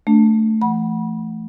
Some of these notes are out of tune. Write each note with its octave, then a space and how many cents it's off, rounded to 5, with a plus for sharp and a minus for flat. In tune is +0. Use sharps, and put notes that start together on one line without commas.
A3 +0 D4 -15
E3 +45 F#5 +0 B5 -25